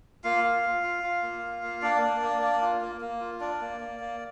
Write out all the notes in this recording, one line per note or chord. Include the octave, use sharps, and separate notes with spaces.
A#3 F4 F5
F4
F4
F4
F4
A#3
F4
A#3
A#3 D4 D5
A#3
A#3
A#3
F4
A#3
A#3
F4
D4 D5
A#3
A#3
A#3